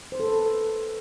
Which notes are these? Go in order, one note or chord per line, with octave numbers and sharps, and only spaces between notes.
C5
A4
B4